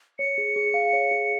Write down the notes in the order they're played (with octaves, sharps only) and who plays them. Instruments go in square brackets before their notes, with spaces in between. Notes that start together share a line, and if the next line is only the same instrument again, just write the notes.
[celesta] C#5 [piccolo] C#7
[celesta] G#4
G#4
F5
C#5
G#4